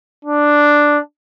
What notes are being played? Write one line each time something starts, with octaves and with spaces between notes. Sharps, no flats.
D4